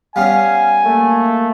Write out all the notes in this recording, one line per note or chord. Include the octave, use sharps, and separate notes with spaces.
G3 B3 C#4 F5 G#5
A3 A#3